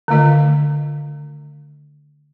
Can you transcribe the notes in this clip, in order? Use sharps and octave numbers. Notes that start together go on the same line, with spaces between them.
D3 D#3 A3 F4 D#5